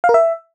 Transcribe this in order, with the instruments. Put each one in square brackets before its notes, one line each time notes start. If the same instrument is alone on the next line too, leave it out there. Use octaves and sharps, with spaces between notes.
[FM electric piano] F5
A#4
E5